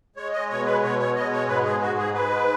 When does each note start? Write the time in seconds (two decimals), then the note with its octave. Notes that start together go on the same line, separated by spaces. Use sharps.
0.16 G#3 C#5
0.33 D#5
0.50 B2 C#5
0.66 B4
0.82 B2 C#5
0.99 C#5
1.16 G#3 D#5
1.32 C#5
1.48 G#2 B4
1.64 G#4
1.81 G#2 F#4
1.98 G#4
2.14 G#3 B4